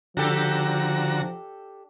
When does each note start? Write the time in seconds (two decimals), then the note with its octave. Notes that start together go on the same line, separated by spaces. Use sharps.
0.17 D3 F3 D4 F#4 G4 A4 A#5